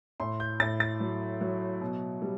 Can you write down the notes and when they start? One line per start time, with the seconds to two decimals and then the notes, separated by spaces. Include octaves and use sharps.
0.20 A2 C6
0.40 G6
0.60 A2 A6
0.80 A6
1.00 F#3
1.41 F#3
1.81 B2
2.22 G3